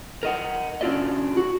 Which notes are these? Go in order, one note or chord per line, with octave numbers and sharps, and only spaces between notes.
A#4 D#5 F#5
C#4 D4 F4 F#4 D5 D#5
F#4